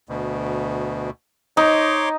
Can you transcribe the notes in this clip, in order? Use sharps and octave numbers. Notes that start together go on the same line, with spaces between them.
D2 B2
D#4 C#5 C6 D6